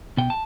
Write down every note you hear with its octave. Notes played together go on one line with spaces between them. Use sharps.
B2 G5
A5